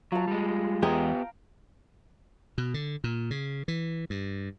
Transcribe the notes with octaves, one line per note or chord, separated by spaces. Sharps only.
F#3 F4 A5
G3 G#3
E2 G#3 B3 G4 G#4 F5 G5 A#5
B2
D3
A#2
C#3
E3
G2